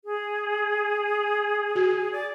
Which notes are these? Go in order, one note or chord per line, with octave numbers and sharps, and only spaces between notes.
G#4
F#4
D5